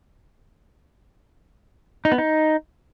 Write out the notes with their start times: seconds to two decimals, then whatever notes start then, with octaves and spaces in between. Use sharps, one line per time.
2.05 D#4
2.12 B3
2.18 D#4